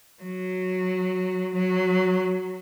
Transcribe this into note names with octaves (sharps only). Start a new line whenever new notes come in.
F#3
F#3